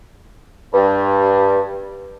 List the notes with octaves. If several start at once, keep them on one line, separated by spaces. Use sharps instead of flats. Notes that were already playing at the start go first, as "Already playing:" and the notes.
G2